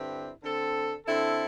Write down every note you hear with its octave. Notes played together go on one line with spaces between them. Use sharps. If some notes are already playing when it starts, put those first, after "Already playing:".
Already playing: G2 D3 C4 E4 G4
D3 C4 A4
D3 C4 E4 A4